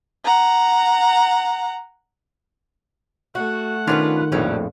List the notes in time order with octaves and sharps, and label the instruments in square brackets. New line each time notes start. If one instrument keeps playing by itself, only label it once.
[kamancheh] F#5 A#5
[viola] A3 F#5 [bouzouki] F#4
[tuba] D#3 [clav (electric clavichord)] B3 C#4 D4 [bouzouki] F4 F#4 B4
[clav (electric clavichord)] A#1 F2 A2 [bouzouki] F#3 G3 C#4